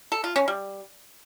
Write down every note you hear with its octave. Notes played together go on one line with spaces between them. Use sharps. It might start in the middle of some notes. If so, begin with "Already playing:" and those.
A4
F4
C#4
G3